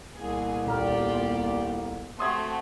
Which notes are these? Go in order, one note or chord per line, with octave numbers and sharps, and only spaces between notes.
C2 A#2 A#3 B3 G#4
D#1 F4 G4 D5 A#5 F6
A3 C4 F#4 C6 D#6 G#6